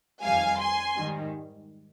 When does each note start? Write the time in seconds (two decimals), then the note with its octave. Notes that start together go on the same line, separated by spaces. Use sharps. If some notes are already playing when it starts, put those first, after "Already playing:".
0.22 F2 D#3 G3 F5 G#5
0.59 G#5 C6
0.96 G#2 D#3 G3